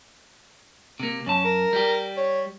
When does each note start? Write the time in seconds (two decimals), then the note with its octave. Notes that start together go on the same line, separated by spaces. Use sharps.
1.00 C3 A#3
1.26 F#2 C#4 A5
1.45 A#4
1.73 G3 G4
2.17 C#5